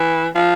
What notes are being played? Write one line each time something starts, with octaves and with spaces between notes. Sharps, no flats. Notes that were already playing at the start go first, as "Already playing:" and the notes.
Already playing: E3
F3